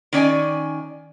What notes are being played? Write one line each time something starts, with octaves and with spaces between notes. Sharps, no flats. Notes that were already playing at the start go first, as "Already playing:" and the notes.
D#3 C#4 D5 G#5